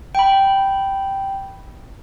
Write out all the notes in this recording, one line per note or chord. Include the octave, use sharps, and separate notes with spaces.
G5 B5